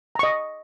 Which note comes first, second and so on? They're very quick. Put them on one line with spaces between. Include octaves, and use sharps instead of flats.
A#5 C#6 D#5